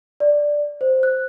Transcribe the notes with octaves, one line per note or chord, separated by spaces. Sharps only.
D5
C5
F#6